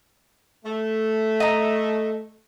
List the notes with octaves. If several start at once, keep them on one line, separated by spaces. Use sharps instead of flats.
A3
D#5 A#5